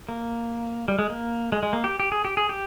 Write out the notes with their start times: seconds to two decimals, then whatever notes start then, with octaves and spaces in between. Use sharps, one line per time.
0.09 A#3
0.88 G3
0.99 G#3
1.10 A#3
1.52 G#3
1.63 G#3
1.73 A#3
1.84 G4
2.00 G4
2.12 G#4
2.25 G4
2.37 G#4
2.49 G4